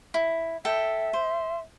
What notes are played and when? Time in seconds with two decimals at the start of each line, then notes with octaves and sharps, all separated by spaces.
0.14 E4
0.65 A4 E5 G5
1.13 C5